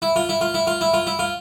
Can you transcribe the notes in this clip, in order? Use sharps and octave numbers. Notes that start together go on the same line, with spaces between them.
E4
F4
E4
F4
E4
F4
E4
F4
E4
F4